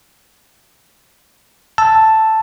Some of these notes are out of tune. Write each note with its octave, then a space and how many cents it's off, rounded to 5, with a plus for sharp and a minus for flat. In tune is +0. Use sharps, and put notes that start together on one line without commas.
A5 +0 E6 +0